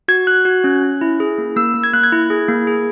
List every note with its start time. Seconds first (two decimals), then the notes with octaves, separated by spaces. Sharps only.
0.08 F#4 G#6
0.27 F#4 F#6
0.45 F#4
0.64 C#4
0.83 C#4
1.01 E4
1.20 G#4
1.38 A#3
1.56 A#3 E6
1.74 A#3
1.84 G#6
1.93 A#3 F#6
2.03 G#6
2.12 E4
2.30 G#4
2.48 A#3
2.67 G#4